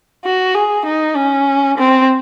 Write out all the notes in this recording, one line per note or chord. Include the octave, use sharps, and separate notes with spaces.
F#4
G#4
D#4
C#4
C4